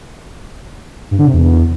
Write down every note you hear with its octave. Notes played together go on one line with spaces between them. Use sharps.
G2
D3
C3
E2